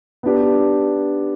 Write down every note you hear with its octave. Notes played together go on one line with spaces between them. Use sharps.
B3 D4 G4